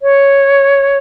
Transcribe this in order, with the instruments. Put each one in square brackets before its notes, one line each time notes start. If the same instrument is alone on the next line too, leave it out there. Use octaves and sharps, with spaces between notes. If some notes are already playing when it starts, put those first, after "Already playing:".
[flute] C#5